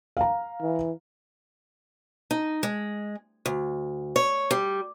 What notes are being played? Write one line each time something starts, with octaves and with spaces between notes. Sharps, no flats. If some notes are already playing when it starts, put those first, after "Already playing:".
F5 A#5
E3
D#4
G#3
D2
C#5
G3